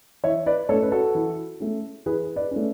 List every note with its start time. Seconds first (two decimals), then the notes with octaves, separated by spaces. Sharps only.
0.24 E3 C#5 E5
0.46 B4 D5
0.69 A3 A4 C#5
0.73 C#4
0.82 B4
0.92 F#4 A4
1.15 E3
1.60 A3 C#4
2.06 E3 G#4 B4
2.36 B4 D5
2.51 A3 C#4